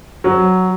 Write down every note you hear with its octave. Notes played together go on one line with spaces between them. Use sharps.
F#3